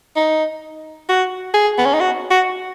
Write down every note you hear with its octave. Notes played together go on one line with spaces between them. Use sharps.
D#4
F#4
G#4
B3
C#4
D#4
F#4
F#4